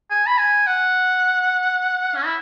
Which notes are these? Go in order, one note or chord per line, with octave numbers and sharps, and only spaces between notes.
G#5
B5
G#5
F#5
C#4
E4